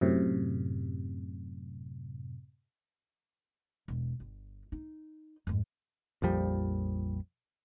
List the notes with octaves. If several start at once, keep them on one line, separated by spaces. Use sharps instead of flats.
F#2 A2 C3
E1
G1
D#4
F2 G#2
A#1 F2 F3 G3